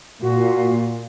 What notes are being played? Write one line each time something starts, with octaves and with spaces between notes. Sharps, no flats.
A#2 F#4